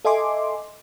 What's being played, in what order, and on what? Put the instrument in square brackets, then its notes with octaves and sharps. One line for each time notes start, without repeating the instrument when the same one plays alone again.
[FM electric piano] A4 D#5 E5 G#5 C6 D6